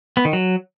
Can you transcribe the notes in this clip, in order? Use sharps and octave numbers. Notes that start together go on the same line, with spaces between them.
B3
D#3
F#3